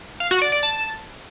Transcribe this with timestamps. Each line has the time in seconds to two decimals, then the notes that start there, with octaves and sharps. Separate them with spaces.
0.20 F5
0.31 F#4
0.42 D5
0.52 D5
0.63 A5